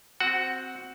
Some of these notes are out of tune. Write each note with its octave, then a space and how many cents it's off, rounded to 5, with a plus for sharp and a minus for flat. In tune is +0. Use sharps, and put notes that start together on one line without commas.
C4 +0 F#4 +0 F#5 +10